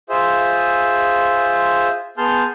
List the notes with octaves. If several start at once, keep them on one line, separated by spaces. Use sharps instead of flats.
F4 G#4 C5 E5
B3 G#4 A5 C6 F6 G6